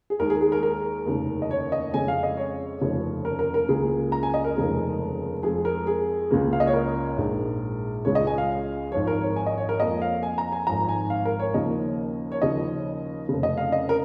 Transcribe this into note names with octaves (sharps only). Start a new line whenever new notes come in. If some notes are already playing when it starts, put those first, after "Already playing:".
G#4
D#2 D#3 G#3 A#4
G#4
G#4
A#4
A#4
F1 D#2 C#3
D#5
C#5
D#5
F2 C#3 G#3 G#5
F5
D#5
C#5
F1 D#2 C#3 F3
A#4
A#4
A#4
C#2 C#3 A#3 G#4
A#5
G#5
D#5
A#4
F1 D#2 C#3 F3 G#3
F2 F3 G#3 G#4
A#4
G#4
C#2 C#3 A#3
F5
D#5
C#5
A#4
A#1 G#2 G#3
C#2 C#3 G#3 C#5
D#5
G#5
F5
G#1 G#2 F3 C#5
A#4
C#5
G#5
D#5
C#5
A#4
F2 F3 A#3 D#5
F5
G#5
A#5
G#5
G#1 G#2 F3 A#5
G#5
F5
A#4
C#5
D#2 C#3 F3 A#3 D#5
C#5
D#2 C#3 F3 D#5
F1 F2 C#3
D#5
F5
D#5
A#4